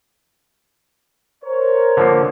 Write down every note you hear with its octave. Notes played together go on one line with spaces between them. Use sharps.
A#4 C5 C#5
D3 F3 A#3